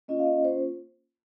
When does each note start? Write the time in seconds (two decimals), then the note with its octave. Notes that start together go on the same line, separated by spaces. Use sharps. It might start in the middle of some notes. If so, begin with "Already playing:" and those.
0.08 A#3 C#4 F4 D#5
0.19 F5
0.26 D#5
0.45 C5